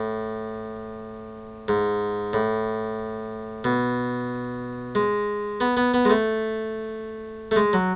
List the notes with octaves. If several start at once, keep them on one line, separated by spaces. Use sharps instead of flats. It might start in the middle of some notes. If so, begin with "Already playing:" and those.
Already playing: A2
G#2
A2
B2
G#3
B3
B3
B3
G#3
A3
A3
G#3
F#3